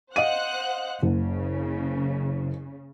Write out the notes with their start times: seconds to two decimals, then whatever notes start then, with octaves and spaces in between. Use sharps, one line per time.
0.16 C5 D#5 F5 F#5 F#6 D#7
1.02 F#1 C#3